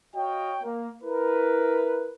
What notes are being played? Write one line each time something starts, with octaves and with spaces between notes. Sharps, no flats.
F#4 C#5 D#5 F5 G5
A#3
E4 A#4 B4